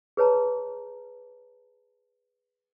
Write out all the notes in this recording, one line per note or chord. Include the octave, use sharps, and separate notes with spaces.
G#4 B4 C#5 A5 A#5